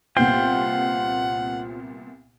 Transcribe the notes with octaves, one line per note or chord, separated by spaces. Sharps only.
C2 A#2 B3 F4 C5 F#5 G5